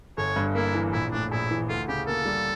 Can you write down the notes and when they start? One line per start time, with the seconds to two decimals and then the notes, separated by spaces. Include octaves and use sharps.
0.17 G1 C#5
0.36 G2
0.55 A#3 E4
0.74 E3
0.93 A#1 E4
1.12 A2 D4
1.31 A#1 E4
1.51 E3
1.69 D2 F4
1.88 C#3 G4
2.07 A#3 A4
2.26 G3